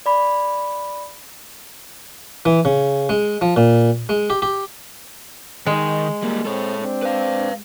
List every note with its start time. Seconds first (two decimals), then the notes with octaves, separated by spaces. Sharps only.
0.06 D5 B5
2.45 E3
2.65 C#3
3.09 G#3
3.41 F3
3.56 A#2
4.09 G#3
4.30 G4
4.42 G4
5.67 D#3 G#3 D#4
6.23 G3 A#3
6.45 C4 A4 C#5
6.81 C4 D4
7.02 B4 F5